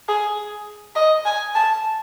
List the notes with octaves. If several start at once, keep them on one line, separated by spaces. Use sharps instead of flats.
G#4
D#5
G#5
A5